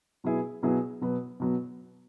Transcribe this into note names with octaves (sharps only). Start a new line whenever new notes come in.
B2 F#3 B3 E4 G#4
B2 F#3 B3 E4 G#4
B2 F#3 B3
B2 F#3 B3